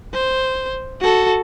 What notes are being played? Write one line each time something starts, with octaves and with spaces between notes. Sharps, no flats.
C5
F#4 A4